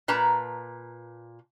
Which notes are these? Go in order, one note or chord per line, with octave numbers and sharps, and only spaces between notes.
A#2 B4 A5 A#5